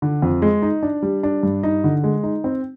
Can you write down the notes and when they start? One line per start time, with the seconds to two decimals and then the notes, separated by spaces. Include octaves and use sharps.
0.02 D3
0.22 F2
0.42 G#3
0.62 D#4
0.83 D4
1.02 G3
1.23 D4
1.43 G2
1.63 D#4
1.84 D3
2.04 G#3
2.23 D#4
2.44 C4